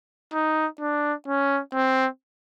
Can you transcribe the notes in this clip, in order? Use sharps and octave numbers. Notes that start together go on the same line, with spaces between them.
D#4
D4
C#4
C4